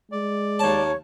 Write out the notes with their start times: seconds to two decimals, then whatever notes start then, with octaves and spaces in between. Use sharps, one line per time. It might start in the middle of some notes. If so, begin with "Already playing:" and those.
0.12 G#3 D5
0.59 D#2 C#5 A5